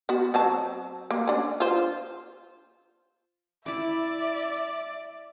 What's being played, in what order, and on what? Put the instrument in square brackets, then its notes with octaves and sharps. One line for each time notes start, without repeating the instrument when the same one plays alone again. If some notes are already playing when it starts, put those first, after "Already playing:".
[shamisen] B3 F#4
F#3 C4 A5
A#3
C#4 D4
F4 C5
[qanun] E4 D6 [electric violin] D5 [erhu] E5